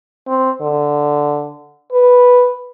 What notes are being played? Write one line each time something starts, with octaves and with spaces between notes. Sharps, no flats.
C4
D3
B4